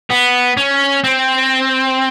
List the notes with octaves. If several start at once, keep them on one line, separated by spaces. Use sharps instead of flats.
B3
C#4
C4